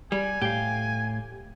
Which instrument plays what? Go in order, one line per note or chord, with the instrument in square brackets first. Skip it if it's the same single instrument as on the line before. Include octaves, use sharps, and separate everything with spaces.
[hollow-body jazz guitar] G3 [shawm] G#5
[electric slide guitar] A2 F5 [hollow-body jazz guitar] G4